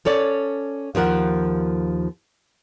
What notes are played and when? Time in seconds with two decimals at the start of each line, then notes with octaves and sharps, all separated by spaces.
0.05 C#4 A4 C#5 D5
0.95 D#2 F3 A#4 F#5